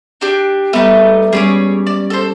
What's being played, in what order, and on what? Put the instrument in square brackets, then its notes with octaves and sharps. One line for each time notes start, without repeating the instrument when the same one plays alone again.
[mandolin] D4 G4
[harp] G3 B3 [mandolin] A3 D#4
[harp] G3 C#4 [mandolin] G#4 C#5 D6
[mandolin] D5
A4 C5